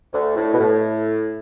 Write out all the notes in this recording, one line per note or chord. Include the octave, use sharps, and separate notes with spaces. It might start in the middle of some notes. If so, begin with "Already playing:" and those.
D2 D3
A2
B2
A2